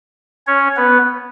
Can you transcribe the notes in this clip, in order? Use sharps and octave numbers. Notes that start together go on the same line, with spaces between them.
C#4 C#5
B3 B4